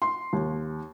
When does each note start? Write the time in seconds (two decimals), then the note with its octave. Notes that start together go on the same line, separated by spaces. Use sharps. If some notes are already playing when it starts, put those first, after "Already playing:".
0.02 C6
0.33 D#2